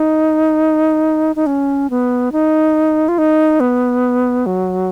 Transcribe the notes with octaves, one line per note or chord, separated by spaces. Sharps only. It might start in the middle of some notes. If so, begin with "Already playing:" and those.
Already playing: D#4
D#4
C#4
B3
D#4
F4
D#4
B3
F#3